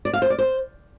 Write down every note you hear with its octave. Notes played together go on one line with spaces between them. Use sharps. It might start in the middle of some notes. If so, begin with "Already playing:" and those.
D5
F5
C5
D5
C5